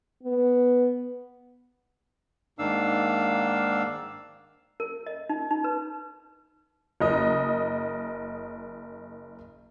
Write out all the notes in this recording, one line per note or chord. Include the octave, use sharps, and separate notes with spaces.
B3
G#2 D#3 A#3 D4 F5 E6
A#4
D#5
D#4
D#4
B4
F#1 A#4 D#5 D#6